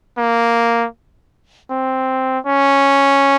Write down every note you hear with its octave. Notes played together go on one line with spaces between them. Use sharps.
A#3
C4
C#4